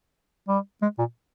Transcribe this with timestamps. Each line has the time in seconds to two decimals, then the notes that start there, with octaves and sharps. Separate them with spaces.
0.48 G3
0.82 G#3
0.98 A#2